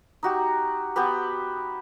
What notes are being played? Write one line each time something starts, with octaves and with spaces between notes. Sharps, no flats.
D#4 F#4 G4
B3 F#4 G4 B4